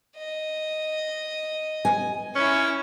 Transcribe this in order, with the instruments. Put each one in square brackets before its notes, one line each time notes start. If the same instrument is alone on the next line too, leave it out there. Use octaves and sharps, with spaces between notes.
[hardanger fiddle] D#5
[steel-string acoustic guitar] G#5
[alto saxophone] C#4 [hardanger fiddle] E4 C#6